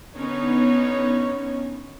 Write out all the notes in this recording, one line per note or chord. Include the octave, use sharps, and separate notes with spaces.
D3 B3 C#4 D#4 C#5